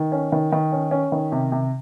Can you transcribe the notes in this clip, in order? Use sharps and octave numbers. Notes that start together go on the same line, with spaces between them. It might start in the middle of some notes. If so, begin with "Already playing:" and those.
Already playing: D#3
C#4
D#3
D#3
C#4
C#4
D#3
C3
C3